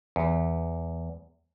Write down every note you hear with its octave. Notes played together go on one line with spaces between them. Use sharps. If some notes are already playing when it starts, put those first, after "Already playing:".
E2